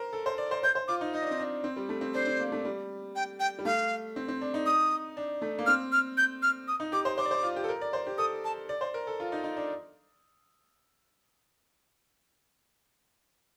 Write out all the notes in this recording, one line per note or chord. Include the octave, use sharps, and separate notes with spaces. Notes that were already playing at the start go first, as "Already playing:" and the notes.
Already playing: A#4 C5
A4
C5
D5
C5
C5 G6
C5
F4 D6
D#4
D#4 D#5
D4
C4
D4
C4
G3
A3
C4
D4 C5
C4
A#3
A3
G3
G5
G5
G3
A3 F5
C4
C4
D4
D#4
D#6
D4
A3
A#3
C4 F6
F6
G6
F6
D#6
D#4
G4 D6
C5
C5 D6
D5
C5
F4
G4
A4
A#4
D5
C5
G4
A4 D#6
A5
D5
C5
A#4
A4
F4
D#4
D#4
D4